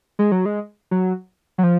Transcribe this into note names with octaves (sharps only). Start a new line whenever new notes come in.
G#3
F#3
G#3
F#3
F#3
F3